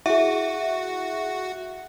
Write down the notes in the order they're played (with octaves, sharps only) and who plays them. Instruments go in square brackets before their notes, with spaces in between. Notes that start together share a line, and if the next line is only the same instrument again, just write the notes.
[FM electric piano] E4 G#4 [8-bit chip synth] F#4 [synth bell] E5